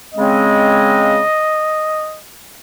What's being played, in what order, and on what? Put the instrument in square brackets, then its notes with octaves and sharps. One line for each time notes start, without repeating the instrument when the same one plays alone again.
[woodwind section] C#3 G#3 C4 [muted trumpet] D#5